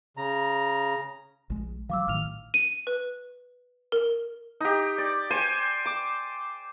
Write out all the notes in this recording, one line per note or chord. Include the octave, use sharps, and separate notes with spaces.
C#3 A#5
A#1 G#3
E3 F#3 F5 D6 E6
A1 A2 D#3 F6 F7
D#7
B4
A#4
D#4 G4
D5
C5 G5 G#5
D6